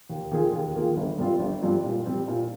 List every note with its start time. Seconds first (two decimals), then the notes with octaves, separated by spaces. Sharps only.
0.10 D#2
0.32 D#3 A#3 F4 G#4
0.53 D#2
0.75 D#3 A#3 F4 G#4
0.97 G1
1.18 G2 G3 C4 F4
1.39 G1
1.62 G2 G3 C4 F4
1.84 A#2
2.06 G3 C4
2.28 A#2